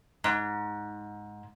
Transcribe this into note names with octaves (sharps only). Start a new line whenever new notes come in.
G#2